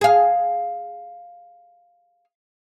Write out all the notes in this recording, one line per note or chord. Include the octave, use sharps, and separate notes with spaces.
G#4 F5